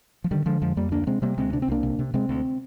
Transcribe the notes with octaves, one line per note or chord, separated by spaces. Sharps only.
F3
D3 D#3 G3
D3 F3 G#3
F2 F3 G#3
F2 G3 A#3
D2 A#3 D4
C3 G#3 C4
C3 G3 A#3
D2 G#3 C4
C3 D4
C4
C2 A#3 D4
C3
C3
C3 G#3 C4
D2